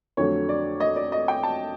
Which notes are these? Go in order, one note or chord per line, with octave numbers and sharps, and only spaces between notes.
F2 D3 F#3 A3 C#5
D5
D#5
D5
D#5
G5
A5